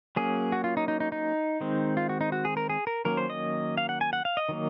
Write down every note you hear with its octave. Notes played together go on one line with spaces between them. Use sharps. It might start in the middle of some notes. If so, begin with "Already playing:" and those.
F#3 A#3 C#4 G#4
F#4
F4
D#4
D#4
D#4
D#4
D#3 G#3 C4
F4
F#4
D#4
F#4
G#4
A#4
G#4
A#4
D#3 F#3 A#3 C#4 A#4
C5
D#5
F5
F#5
G#5
F#5
F5
D#5
D#3 F#3 A#3